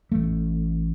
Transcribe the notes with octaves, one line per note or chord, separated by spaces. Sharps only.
A1 A3